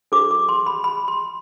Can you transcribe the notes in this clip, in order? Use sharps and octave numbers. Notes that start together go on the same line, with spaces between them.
D4 F#4 A4 C5 D6
D6
C6
B5
B5
C6